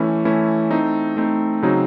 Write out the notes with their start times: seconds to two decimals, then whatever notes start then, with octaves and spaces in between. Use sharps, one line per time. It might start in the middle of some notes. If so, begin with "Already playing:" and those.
Already playing: E3 A3 C#4 E4
0.25 E3 A3 C#4 E4
0.71 A3 C4 D#4
1.16 A3 C4 D#4
1.62 C#3 F#3 C4 D#4